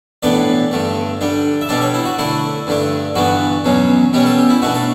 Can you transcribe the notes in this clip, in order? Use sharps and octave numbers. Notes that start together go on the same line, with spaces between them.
A2 E3 B3 D4 D5
G2 D3 A3
D3 G3 D4
E5
B2 G3 D4 D5
C#5
E4
F#4
D3 A3 D4 E4
G2 D3 A3 D4
G2 E3 B3 D4 F#4
E2 B2 F#3 C#4
B2 G3 C#4 G4
A4
G4
E4
B2 A3 D4 F#4
A4